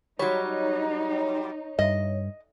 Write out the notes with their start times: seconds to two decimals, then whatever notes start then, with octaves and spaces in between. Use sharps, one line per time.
0.19 F#3 G3 D#4 C#5
1.79 G2 D#5